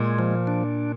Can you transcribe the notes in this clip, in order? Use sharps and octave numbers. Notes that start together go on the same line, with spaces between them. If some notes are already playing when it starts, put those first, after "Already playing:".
Already playing: A#2 G#3
F3
D4